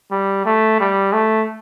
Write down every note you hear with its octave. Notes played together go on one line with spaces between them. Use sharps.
G3
A3
G3
A3